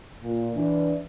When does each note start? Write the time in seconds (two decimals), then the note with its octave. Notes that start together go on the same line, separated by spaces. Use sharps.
0.22 A#2
0.56 E3 D4